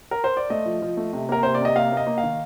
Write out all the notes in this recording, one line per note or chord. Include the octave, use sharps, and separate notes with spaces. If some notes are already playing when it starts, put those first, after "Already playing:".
A#4
C5
D5
A3 D#5
F3
F3
A3
C3
A#3 A#4
C3 C5
D5
C3 D#5
A#3 F5
A#3 D#5
A#3
F5
D#3